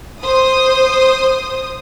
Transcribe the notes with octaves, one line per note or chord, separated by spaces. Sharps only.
C5 D#6